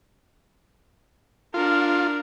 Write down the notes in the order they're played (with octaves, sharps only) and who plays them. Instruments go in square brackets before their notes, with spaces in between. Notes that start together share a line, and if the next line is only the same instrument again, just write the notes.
[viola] D4 A#4 [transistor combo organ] F4